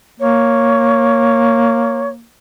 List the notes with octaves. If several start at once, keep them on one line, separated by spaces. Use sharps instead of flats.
A#3 C#5